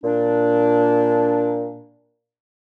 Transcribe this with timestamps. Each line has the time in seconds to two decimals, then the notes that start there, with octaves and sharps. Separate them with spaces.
0.03 A#2 D4